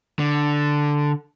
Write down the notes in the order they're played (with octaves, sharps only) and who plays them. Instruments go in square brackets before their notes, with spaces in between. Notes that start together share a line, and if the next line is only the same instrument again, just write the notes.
[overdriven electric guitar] D3